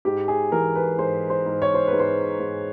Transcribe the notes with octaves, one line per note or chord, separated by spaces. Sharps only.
G#2 G4
G#4
E3 A#4
B4
G#2 C5
C5
G#2
C#5
C5
B4
G#2
C5
G#2